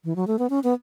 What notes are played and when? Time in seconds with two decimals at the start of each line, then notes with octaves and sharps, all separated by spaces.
0.05 E3
0.16 F#3
0.27 A3
0.39 B3
0.50 C#4
0.64 B3